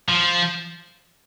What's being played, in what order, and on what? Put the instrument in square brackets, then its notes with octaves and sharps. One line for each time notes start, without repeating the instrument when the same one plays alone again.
[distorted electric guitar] F3